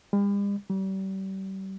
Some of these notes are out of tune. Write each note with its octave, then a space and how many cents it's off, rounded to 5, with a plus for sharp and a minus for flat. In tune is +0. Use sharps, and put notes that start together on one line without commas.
G3 +45
G3 -35